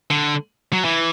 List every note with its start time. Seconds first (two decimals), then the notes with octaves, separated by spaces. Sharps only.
0.10 D3
0.73 F#3
0.84 E3